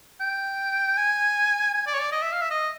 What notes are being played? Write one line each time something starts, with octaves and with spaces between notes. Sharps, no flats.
G5
G#5
G#5
D5
C#5
D5
D#5
E5
F5
E5
D#5